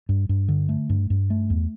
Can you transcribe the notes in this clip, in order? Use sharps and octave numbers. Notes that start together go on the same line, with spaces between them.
G2
G2
D3
A3
G2
G2
A3
E2